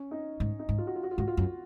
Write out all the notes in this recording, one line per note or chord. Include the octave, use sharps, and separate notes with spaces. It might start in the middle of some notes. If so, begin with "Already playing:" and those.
Already playing: C#4
D#4
G#2
D#4
G#2
F4
F#4
F4
F#4
F4
G#2 F#4
F4
F#2